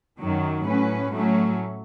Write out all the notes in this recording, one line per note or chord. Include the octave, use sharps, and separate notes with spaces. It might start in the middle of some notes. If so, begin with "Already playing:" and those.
F#2 D#3 F#3
A2 F#3 C#4 B4
A2 F#3 A3 C#4